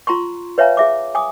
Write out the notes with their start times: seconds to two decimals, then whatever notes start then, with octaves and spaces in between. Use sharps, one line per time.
0.07 F4 A#5 C6 C#6
0.58 B4 C#5 E5 F5 G#5 A#5
0.77 G#4 E5 D6
1.15 G#5 D6 D#6